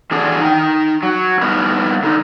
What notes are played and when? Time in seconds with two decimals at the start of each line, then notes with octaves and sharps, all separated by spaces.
0.11 E3 F#3 D4 G#4 A4 D5
0.41 D#4 G5
1.03 F#3
1.42 G3 B3 D#4 E4 A#4 B4
2.03 D3 D#4